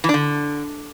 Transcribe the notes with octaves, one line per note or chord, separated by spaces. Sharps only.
E3
D4
D3